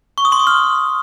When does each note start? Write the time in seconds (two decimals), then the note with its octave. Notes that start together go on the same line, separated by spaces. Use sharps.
0.18 C#6
0.25 D#6
0.32 C6
0.40 D#6
0.47 F6